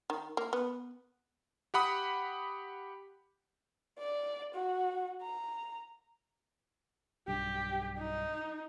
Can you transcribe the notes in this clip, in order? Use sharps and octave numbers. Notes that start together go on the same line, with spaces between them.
D#3
A#3
B3
G4 F#5 B5 D#6
D5
F#4
A#5
B1 G2 G4
D#4